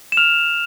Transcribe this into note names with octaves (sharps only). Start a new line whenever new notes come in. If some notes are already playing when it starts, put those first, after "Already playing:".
E7
F6 F7